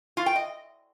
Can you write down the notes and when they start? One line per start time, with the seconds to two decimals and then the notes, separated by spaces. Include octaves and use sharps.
0.17 F4
0.26 G5
0.36 D#5